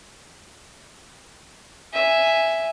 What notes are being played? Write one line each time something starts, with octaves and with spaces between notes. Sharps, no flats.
E5 G#5